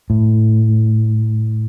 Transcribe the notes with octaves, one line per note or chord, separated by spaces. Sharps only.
A2